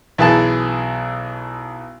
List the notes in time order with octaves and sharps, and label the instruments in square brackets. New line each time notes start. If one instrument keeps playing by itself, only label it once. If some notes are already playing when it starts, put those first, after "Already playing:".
[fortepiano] B1 E3 G#4 A5